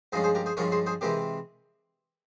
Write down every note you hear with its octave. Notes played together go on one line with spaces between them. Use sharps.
G2 F3 G#3 C#4 G#4 C5
G#4 C5
G4 A#4
G#4 C5
G2 F3 G#3 C#4 A#4 C#5
G#4 C5
G#4 C5
C3 E3 G#3 C4 G4 A#4